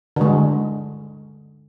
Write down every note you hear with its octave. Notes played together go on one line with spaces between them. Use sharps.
D3 G#3